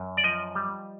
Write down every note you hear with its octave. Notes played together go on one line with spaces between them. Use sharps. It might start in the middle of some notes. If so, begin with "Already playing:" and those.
Already playing: F#2
D5
F3 D#5
G3